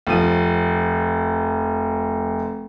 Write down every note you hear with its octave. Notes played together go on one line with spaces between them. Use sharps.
F1 F3 D#7